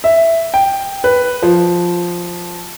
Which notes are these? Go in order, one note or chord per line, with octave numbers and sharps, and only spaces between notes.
E5
G5
B4
F3